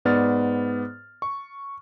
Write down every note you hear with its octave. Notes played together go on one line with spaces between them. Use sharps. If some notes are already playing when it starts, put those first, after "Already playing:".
G#2 B3 D5 F6 A6
C#6